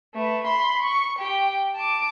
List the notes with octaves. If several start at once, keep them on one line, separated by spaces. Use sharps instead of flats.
A3 B4
B5 C6
C#6
G4 G5
A5 D6